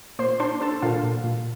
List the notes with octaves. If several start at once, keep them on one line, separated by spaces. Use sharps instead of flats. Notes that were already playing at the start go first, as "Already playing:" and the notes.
A#2 C5 C6
D4 C5 C6
D4 A4 A5
A#2 F4 F5
A#2
A#2